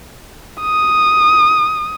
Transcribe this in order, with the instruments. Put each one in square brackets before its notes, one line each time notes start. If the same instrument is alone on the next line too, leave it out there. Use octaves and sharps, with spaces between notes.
[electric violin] D#6